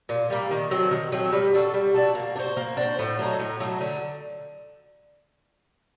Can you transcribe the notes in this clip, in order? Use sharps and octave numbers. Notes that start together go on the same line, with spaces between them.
A#2
G3 A#3
D#3
F#3 A3 C4
D#3
F#3 A3 C4
G3
D4 F#4 A4
G3
D4 F#4 A4
A#3
D4
F#4 C5
A#3
D4 F#4 C5
A2
F#3 A3 D#4
A2
F#3 A3 D#4
D3